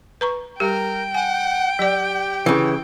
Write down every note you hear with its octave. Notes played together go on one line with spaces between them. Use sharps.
B4 A#5 C#6
G3 G4 A#4 G5
F#5 G#5
F#3 G4 D5
C#3 E3